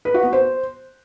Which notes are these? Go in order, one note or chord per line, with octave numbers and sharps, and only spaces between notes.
B4
F#4
B3
C5